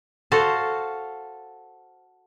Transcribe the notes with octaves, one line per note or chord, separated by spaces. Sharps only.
F#4 A4 C5 F5